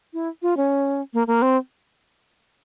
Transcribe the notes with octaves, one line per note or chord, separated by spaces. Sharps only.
E4
F4
C#4
A#3
A#3
C4